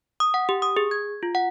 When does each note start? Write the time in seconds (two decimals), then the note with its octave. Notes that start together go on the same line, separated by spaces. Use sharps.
0.20 D#6
0.34 F#5
0.49 G4
0.62 D#6
0.77 G#4
0.91 G#6
1.23 F4
1.35 F#5